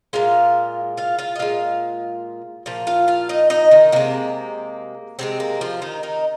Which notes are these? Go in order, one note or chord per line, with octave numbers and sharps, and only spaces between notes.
A#2 G#3 F4 F5
F4 F5
F4 F5
D#5
A#2 G#3 F4 F5
A#2 F3 F5
F4 F5
F4 F5
D#4 D#5
D#4 D#5
D#3 D#4
C3 G#3 A#3
C3 D#3 G#3 C4
A#3
F3 F4
D#3 D#4
D#3 D#4